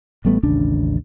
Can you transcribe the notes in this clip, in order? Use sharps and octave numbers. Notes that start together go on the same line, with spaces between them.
A1 G3 A3 B3
A1 D#2 C#3 D4